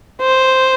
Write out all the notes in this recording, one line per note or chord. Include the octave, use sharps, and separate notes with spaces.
C5